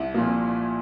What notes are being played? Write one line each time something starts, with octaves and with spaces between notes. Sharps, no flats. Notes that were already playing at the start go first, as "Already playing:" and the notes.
Already playing: C2 E4
A#2 F3 A#3